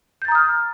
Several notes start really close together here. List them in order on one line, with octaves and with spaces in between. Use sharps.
G6 A6 A#5 D#6 F6